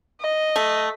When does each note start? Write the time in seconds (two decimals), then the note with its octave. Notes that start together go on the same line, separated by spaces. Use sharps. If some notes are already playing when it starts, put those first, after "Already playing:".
0.22 D#5
0.56 A3